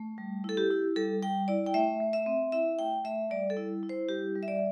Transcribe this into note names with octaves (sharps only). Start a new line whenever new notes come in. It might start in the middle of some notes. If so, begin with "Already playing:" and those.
Already playing: A3
G3
E4 A4
G4
E4
G3 A4
G3 G5
E4 D5
G5
A3 E5
A3
E5
C4
E4 E5
A3 G5
A3 E5
G3 D5
A4
E4
E4
C5
G3 G4
G3
E5
D5